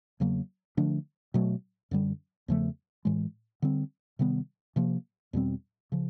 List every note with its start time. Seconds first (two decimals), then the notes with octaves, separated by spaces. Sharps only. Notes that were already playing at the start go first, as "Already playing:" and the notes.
0.20 E2 C#3 F#3 A#3
0.77 D3 F3 A3 D4
1.34 B2 F#3 A3
1.91 F#2 D3 G3
2.48 E2 C#3 F3 A3
3.05 A2 E3 G#3
3.62 D3 G3 C4
4.19 C3 D#3 G3 B3
4.76 C3 F3 A#3
5.33 E2 B2 G3 C4
5.92 C#3 F3